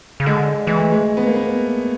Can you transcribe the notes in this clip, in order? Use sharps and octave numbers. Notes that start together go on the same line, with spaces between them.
C#3
D3 G#3
E3 G#3
A3
G#3
B3
A#3
B3